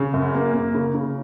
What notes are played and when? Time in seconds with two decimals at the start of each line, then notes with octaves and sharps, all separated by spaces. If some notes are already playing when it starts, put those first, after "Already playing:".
Already playing: C#3
0.14 F#2
0.34 A#3
0.53 A#3
0.75 C#3
0.95 C#3